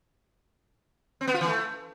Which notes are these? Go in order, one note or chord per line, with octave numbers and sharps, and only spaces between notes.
C4
B3
F4
E3
A3